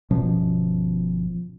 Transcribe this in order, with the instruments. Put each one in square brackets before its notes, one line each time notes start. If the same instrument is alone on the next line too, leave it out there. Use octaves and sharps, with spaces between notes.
[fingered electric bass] G1 B2 F3 C#4